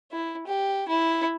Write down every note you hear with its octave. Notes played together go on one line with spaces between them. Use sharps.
E4
G4
E4